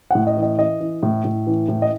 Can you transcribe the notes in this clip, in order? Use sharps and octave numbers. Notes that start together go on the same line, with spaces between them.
A2 F#5
D#5
E3
D#5
E3 D#5
E3
A2
A2
E3
A2
D#5